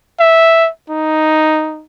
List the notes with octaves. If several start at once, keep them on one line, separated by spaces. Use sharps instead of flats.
E5
D#4